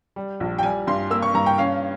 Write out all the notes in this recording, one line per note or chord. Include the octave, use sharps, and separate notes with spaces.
G3
A#1
G5
G3 G#5
G2 C6
A#3 E6
C#6
G2 A#5
G5
C#4 F5